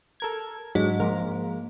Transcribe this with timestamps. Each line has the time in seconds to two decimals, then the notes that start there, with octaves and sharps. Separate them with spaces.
0.20 A4 A#4 G#6
0.75 G#2 F#3 D4
1.00 F3 G#3 A#3 A#4